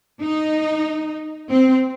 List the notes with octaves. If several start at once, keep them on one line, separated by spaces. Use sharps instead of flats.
D#4
C4